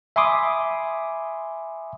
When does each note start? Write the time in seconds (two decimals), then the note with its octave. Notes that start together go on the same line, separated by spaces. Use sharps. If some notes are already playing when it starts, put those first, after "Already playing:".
0.16 E5 G#5 B5 C6 D6 D#6